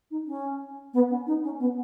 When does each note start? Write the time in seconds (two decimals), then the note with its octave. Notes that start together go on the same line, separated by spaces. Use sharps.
0.11 D#4
0.27 C#4
0.93 B3
1.10 C#4
1.27 D#4
1.43 C#4
1.60 B3